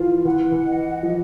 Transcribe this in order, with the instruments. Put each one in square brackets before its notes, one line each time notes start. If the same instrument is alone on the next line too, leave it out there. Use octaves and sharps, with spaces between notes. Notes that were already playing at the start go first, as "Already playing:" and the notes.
Already playing: [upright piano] E3 F3 [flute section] F4
[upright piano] E3 [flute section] F#5
[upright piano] E3
[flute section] D#5
[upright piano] F3 [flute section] F#5